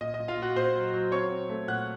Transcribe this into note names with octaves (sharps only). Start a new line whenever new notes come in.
A#2 D#5
D#5
A#2
F4 F5
A#2
F#4 F#5
A#2 C5 C6
F#3
F#3
C4 C#5 C#6
C4
A3
A#2 F#5 F#6